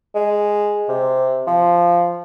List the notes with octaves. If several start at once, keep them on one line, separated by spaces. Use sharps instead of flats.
G#3
C3
F3